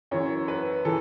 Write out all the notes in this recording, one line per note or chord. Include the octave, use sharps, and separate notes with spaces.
F#2 E3 C#5
B4
E3 A4